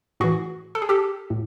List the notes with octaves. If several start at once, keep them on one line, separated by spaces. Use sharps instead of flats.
A2 E3 F#4 G#4
A4
G#4
G4 A4
A2